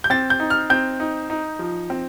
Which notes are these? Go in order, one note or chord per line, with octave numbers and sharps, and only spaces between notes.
G6
C4 A6
G6
D#4
F6
C4 G6
D#4
D#4
F3
C4